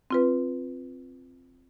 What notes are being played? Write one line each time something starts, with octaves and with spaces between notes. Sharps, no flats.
C4 F4 B4